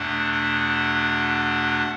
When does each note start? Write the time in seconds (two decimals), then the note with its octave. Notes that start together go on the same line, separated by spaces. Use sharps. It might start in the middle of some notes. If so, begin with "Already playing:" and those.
Already playing: E2 B2 A3 D4 F#5
0.32 F#5